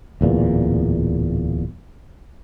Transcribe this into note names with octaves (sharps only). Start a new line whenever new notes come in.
D1 E2 A#2